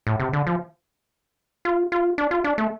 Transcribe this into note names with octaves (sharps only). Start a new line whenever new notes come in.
A2
C3
D3
F3
F4
F4
D4
F4
D4
A3